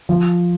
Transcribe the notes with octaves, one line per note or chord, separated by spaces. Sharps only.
F3